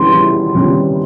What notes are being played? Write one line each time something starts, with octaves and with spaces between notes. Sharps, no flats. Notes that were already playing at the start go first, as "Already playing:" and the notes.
Already playing: E3 G3 C#4 C6
E3
G3 C#4